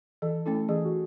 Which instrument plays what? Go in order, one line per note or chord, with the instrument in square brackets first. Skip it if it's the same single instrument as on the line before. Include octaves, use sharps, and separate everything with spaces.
[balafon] E3 [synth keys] A4
[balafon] A3 C#4 E4 [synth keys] A4
[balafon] E3 [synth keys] G#4
[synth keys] F#4